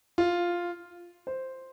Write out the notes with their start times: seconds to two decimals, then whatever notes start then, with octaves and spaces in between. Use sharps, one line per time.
0.18 F4
1.27 C5